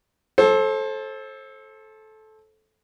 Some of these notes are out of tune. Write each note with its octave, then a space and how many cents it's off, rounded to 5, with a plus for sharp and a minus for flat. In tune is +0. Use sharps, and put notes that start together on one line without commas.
A4 -15 C5 +30